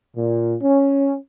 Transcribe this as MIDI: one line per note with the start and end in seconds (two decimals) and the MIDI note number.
0.17 0.55 46
0.62 1.15 61